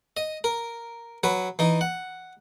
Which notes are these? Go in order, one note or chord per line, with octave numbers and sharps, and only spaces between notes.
D#5
A#4
F#3 B4
E3 D#4
F#5